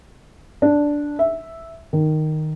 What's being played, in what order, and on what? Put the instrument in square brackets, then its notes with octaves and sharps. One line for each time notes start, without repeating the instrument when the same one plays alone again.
[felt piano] D4
E5
D#3